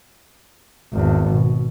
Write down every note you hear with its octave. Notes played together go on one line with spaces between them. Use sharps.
G#1 E2
B2